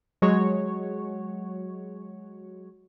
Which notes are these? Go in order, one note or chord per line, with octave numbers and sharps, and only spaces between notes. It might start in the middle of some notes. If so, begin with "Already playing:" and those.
F#3 G#3 F#4 C#5